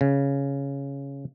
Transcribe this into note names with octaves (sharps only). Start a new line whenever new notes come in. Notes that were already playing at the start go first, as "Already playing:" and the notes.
C#3